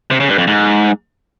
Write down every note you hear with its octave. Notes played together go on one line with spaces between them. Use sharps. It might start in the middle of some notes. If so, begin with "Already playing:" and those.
C3
C#3
G2
F2
G#2